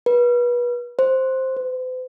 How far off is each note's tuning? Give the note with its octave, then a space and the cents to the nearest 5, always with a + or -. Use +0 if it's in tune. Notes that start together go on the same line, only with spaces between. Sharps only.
B4 -30
C5 +5
C5 -45